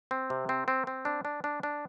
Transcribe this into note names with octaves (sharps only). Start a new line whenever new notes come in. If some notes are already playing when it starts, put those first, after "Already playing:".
C4
C3
C4
C4
C4
D4
D4
D4
D4